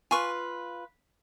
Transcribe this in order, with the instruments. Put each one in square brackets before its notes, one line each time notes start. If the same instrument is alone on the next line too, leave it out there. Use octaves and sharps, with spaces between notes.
[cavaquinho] F4 B4 [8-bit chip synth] G#5 C#6